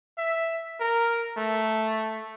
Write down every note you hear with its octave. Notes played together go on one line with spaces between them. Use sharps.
E5
A#4
A3